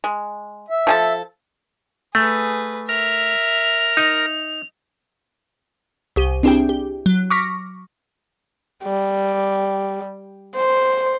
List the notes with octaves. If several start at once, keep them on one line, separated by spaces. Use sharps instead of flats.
G#3
E5
F3 G#4 A4
A3 G#4 B4
A#4 E5 F7
D#4
C2 G4 D#7
C4 D4 E4 G4 G#4 G5
G4
F#3
C#6 D6 F6 A#6 B6
G3
C5